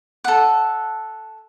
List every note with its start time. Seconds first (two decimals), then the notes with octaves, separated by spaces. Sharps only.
0.24 A4 F#5